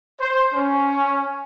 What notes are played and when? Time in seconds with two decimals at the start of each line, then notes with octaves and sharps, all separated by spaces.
0.19 C5
0.54 C#4